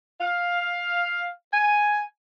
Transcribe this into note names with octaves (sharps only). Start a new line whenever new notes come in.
F5
G#5